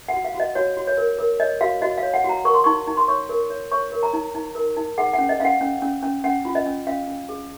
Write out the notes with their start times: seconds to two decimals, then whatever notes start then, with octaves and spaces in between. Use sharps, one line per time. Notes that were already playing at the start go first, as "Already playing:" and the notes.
0.08 F#5
0.13 F#4
0.24 F5
0.35 F#4
0.40 D#5
0.55 F#4 C#5
0.77 F#4
0.87 C#5
0.97 A#4
1.19 A#4
1.40 C#5 D#5
1.61 F#4 F5
1.82 F#4 D#5
1.98 F5
2.03 C#5
2.14 F#5
2.24 F#4
2.29 A#5
2.45 A#4 C#6
2.54 C6
2.64 D#4 C#6
2.87 D#4
2.97 C6
3.08 C#5 C#6
3.29 A#4
3.50 C#5
3.72 C#5 C#6
3.92 A#4
4.03 A#5
4.13 D#4
4.34 D#4
4.55 A#4
4.77 D#4
4.98 G#4 F#5
5.13 F#5
5.19 C#4
5.29 D#5
5.40 C#4 F5
5.45 F#5
5.61 C#4
5.82 C#4
6.03 C#4
6.24 C#4 F#5
6.45 F4
6.55 D#5
6.66 C#4
6.87 C#4 F5
7.07 C#4
7.29 G#4